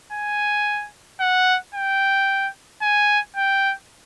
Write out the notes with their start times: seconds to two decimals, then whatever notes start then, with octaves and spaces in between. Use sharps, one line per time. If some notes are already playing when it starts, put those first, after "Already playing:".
0.12 G#5
1.20 F#5
1.74 G5
2.82 G#5
3.36 G5